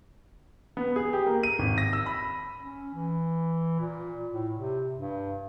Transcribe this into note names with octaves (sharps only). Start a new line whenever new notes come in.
B3
G#4
G4
A#3
D#7
G#1
A#6
E6
B5
C#4
E3
A#2
A2
C3
G2